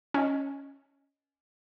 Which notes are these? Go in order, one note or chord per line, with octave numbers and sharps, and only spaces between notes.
C#4 D#5